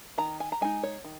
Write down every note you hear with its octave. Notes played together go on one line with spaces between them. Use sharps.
D#3 A#5
G#5
A#5
G#3 D#4 G#5
C#5
D#3